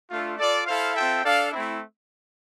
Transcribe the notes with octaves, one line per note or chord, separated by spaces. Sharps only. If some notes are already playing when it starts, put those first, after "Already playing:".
A3 D4 F4 A4
F4 A4 D5
E4 A4 C5 F5
C4 F4 A4 E5 G5
D4 A4 D5 F5
A3 C4 E4